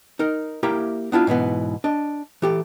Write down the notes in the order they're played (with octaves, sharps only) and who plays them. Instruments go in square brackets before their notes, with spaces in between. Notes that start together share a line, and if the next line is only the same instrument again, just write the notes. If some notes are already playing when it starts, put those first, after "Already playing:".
[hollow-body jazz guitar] D#4 A#4
A#3 E4 G4 A#4 E5 A#5
B3 D4 E4 F4
G#2 B2 E3 B3
D4 D#5
E3 G4 A4